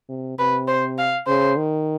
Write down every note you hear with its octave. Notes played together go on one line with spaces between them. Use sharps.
C3
C3 B4
C5
F5
C#3 C5
D#3